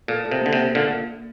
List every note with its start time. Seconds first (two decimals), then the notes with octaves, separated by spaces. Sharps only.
0.08 A#2 A4
0.25 A4
0.32 C3
0.42 D3 A#3
0.53 C3
0.58 A#3
0.75 A#2 D3 A#3